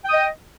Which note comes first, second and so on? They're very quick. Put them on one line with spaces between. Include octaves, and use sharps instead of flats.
G5 D#6 D#5